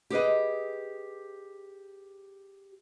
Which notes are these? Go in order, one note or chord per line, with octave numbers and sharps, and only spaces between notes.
G4 G#4 B4 D#5